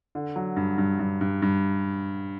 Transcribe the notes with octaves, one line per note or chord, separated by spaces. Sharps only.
D3
F#3
G2
G2
G2
G2
G2